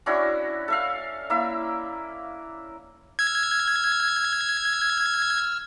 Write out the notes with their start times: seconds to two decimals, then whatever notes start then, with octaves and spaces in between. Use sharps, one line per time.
0.06 C#4 D4 E4 F#4
0.68 A4 E5 F5
1.30 A#3 E4 E5
3.19 E6 F6 G#6